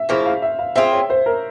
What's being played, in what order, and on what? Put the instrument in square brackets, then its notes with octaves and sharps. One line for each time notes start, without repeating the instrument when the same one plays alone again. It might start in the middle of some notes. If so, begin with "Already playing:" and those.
Already playing: [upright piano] E5
[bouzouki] C#3 F3 A#3 E4 [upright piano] C5
[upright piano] F5
E5
F5
[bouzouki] C4 F4 G#4 [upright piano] E5
[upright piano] C#5
C5
A#4